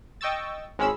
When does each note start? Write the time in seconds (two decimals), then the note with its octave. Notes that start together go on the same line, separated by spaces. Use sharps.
0.21 D#5 G5 C#6 E6 A6
0.78 G#1 G#3 C#4 B5 E6